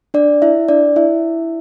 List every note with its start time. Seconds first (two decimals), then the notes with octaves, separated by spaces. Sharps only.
0.14 D4 D5
0.42 E4 E5
0.68 D4 D5
0.96 E4 E5